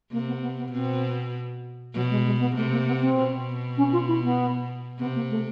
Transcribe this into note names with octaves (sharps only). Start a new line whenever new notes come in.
C3 A#3
B3
B3
B3
B2 C4
B2 F#3
G#3
G#3
B3
C3 A3
A#3
B3
C4
B2
C#4
F4
E4
B3
C3 B3
A#3
A3